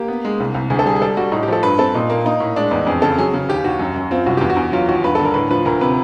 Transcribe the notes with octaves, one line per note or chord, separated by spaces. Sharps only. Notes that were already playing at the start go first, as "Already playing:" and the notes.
Already playing: A#3 G4
B3
G#3
C2
C2
D2 G#4
A4
G3 G#4
G#4
G3 A4
G3 F#4
A2 D#4
G4
F3 A4
G2 B4
C4 A4
A#2 D#4
A#3
A#3 D#4
A2
G#3 D4
E2 D#4
F2 G#4
C#3 A4
F#3 G#4
C#3
D#2 G4
D#2 F#4
F#2
F#2
C4 F4
C2 F#4
E2 G4
F#4
E2
F#3 F4
D#2 F#4
G2 B4
D3 A4
A#4
A2 B4
F3 B4
D2 A#4
C3 B4